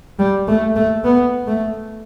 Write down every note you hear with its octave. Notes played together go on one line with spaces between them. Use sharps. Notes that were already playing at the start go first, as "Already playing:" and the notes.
G3
A3
A3
B3
A3